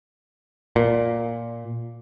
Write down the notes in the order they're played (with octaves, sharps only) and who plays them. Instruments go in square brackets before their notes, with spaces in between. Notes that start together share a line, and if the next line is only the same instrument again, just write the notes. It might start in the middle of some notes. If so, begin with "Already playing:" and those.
[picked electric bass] A#2